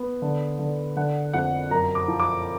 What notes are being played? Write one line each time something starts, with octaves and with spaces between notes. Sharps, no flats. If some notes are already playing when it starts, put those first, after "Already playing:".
Already playing: B3
D3
D3
D3 F#5
F2 F#5
F#2 A#5
D6
F3
D6